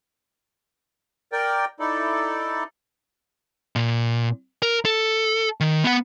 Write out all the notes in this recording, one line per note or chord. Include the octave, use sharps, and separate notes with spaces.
A#4 D5 G5
D#4 E4 A4 D5
A#2
A#4
A4
D#3
B3 F#5